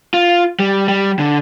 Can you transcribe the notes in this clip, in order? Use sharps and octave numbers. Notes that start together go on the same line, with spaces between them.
F4
G3
G3
D3